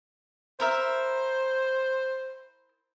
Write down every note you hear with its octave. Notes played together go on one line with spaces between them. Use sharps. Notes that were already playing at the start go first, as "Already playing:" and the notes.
E4 A#4 C5 E5